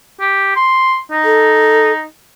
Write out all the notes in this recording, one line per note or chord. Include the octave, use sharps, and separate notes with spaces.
G4
C6
D#4
A4